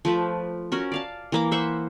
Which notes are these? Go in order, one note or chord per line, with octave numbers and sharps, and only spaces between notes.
F3 A3 B4 A5
C#4 F#4 A#4
D5 F5 A5
E3 A#3 D6
C5 E5 F#5 C#6